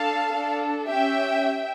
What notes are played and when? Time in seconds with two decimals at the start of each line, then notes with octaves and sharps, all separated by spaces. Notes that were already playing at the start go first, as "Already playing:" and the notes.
Already playing: D4 A4 F5 A5
0.32 D4 A4
0.89 C#4 G4 E5 G5